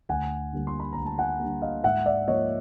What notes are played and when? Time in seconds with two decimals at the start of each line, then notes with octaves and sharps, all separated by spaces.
0.09 D2 F#5 G#5
0.52 D3 G3 A#3
0.67 C6
0.80 B5
0.93 D2 A#5
1.06 A5
1.18 F#5 G#5
1.40 D3 G3 A#3
1.62 D#5 F5
1.84 G#2 E5 F#5
2.06 D5 E5
2.28 F3 A#3 C#5 D#5